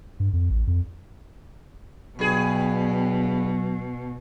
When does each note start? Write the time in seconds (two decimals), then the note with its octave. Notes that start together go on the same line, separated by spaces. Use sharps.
0.20 G2
0.33 F2
0.50 A1
0.67 F2
2.19 G2 B2 F#3 G#4